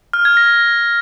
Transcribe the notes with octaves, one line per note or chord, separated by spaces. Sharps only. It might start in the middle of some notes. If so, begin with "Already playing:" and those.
F6
G#6
A#6